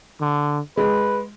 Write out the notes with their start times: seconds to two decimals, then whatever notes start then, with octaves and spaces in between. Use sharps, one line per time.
0.21 D3
0.77 G#3 B4